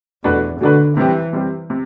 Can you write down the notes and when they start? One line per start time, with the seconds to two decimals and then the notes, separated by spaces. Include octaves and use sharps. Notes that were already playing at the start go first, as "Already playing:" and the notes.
0.24 E2 B2 A3 D4 F#4 B4
0.61 B2 D3 A3 D4 F#4 B4
0.97 C3 E3 G3 C4 G4
1.33 C3 G3 C4 G4
1.70 C3